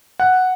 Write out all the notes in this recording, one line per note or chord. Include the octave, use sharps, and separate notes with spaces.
F#5